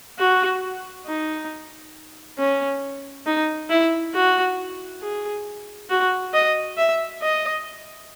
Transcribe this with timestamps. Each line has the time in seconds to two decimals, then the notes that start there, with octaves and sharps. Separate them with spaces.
0.19 F#4
1.07 D#4
2.38 C#4
3.26 D#4
3.70 E4
4.14 F#4
5.02 G#4
5.90 F#4
6.34 D#5
6.78 E5
7.22 D#5